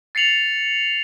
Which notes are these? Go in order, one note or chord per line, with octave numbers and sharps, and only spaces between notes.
A6 C7 C#7 F7 F#7